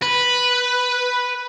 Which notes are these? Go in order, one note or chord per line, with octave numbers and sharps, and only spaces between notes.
B4